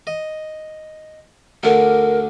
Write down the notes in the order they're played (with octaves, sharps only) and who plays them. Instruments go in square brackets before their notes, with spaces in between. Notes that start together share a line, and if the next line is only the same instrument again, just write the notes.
[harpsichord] D#5
[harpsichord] D2 D3 [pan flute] A#4